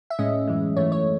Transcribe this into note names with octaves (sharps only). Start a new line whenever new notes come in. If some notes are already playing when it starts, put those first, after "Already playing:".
E5
A2 G#3 C#4 D#5
F#2 E3 G#3
G#2 E3 A3 C#5
C#5